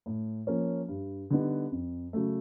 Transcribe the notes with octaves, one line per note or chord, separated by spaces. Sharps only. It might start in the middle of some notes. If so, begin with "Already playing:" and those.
A2
F3 A#3 C#4
G2
D3 G3 B3 D#4
F2
C#3 F#3 A3